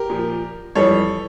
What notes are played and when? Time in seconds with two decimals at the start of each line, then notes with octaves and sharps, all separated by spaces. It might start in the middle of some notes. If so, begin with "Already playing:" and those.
Already playing: G4 A#4
0.10 A#2 F3
0.75 F2 E3 G3 A4 C#5